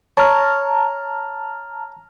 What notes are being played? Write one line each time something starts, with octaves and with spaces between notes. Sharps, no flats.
C#5 A5 A#5 F6